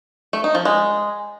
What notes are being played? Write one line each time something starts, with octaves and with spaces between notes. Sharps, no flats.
A3
D#4
F3
G#3